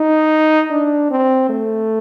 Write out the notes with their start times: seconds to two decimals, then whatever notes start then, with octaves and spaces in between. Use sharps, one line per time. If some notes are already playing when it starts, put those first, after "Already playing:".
Already playing: D#4
0.71 D4
1.11 C4
1.49 A3